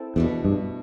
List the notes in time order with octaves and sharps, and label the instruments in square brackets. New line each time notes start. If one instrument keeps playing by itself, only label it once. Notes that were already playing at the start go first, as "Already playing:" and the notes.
Already playing: [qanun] C4 E4 A4
[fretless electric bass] E2 [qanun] B2 A3 D4
[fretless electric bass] G2